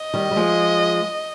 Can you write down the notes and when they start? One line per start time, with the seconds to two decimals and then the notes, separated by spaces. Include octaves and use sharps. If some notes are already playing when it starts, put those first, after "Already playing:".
Already playing: D#5
0.14 D#3 G3
0.31 G3
0.36 F3 G#3